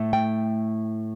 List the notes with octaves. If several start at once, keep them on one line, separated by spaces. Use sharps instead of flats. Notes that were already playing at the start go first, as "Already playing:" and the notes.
Already playing: A2 A3
G5